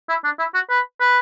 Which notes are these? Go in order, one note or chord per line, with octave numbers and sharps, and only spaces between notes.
E4
D4
E4
F#4
B4
B4